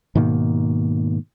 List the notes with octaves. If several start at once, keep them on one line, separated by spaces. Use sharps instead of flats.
G#2 B2 D#3 A#3